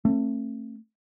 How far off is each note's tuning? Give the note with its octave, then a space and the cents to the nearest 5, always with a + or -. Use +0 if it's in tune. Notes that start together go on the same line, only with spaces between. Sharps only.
A3 +25 C4 +45